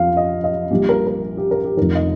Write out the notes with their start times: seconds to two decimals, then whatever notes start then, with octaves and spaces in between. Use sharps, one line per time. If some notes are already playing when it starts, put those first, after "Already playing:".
Already playing: F2 F3 F5
0.17 D#5
0.44 D#5
0.71 A#1 A#2 G3 G4
0.89 A#4
1.07 A#4
1.37 G4
1.51 A#4
1.65 G4
1.77 F1 F2 D#3 A#4
1.95 D#5